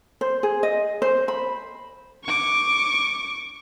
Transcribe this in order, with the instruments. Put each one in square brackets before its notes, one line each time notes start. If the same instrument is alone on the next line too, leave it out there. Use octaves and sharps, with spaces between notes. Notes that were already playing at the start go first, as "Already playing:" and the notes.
[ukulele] C5
G#4
D#5
C5
B5
[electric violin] C#6 D6